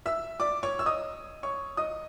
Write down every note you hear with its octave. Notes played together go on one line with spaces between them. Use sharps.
E5 E6
D5 D6
C#5 C#6
E6
D#5 D#6
C#5 C#6
D#5 D#6